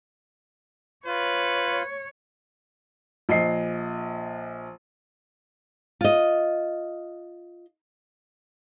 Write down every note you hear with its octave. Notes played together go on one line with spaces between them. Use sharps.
F4 B4 C#5
A#1 D#5 C7
F4 D#5